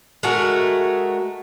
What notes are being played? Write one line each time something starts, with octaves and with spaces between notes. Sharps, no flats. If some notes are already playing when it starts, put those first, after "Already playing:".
G#3 A3 F#4 A#4